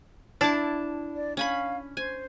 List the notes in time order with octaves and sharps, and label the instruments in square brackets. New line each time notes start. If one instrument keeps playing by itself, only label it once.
[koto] D4 [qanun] E4 A5
[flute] D5
[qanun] C#4 G#5 B5 [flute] F5
[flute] C5 [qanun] G#5